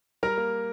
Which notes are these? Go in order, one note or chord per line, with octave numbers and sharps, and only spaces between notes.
G3 A#4 A#5
A#3